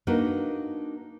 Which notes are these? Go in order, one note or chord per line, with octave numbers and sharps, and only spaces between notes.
A#3 D4 D#4 F#4 A#4 B4